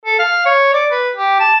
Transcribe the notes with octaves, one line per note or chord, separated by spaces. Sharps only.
A4
F5
C#5
D5
B4
G4
A5